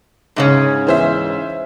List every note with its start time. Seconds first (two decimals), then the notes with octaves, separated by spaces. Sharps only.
0.36 G#2 C#3 C#4
0.87 E3 C5 E5